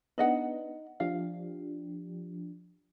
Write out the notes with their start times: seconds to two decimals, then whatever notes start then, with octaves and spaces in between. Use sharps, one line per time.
0.18 B3 D4 D#4 D#5 F#5
1.00 F3 D4 G4 F5